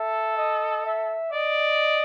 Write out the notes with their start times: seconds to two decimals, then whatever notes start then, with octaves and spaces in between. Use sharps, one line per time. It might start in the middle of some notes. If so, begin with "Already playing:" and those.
Already playing: A4 E5
0.37 D#5
0.85 E5
1.32 D5 D#5